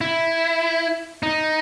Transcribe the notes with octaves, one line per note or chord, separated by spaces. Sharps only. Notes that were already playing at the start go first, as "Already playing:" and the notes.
E4
D#4